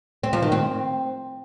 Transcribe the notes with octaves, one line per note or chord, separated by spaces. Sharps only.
C4
F3
D#3
C4